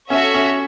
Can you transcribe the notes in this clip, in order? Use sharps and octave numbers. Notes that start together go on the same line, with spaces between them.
C#4 F#4 A4 C#5 E5
C#4